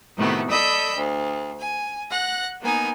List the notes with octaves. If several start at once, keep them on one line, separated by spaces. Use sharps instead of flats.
A2 C3 D#3 A3 B3 F#4
A4 D5 D#5 B5 E6 G6
D2
G#5
F#5 F#6 A#6
A#3 B3 D#4 G#5